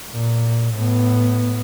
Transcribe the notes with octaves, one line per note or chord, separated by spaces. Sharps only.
A#2
A2 B3